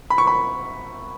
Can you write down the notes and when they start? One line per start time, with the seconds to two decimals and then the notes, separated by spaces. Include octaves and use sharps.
0.10 B5
0.18 C#6
0.27 B5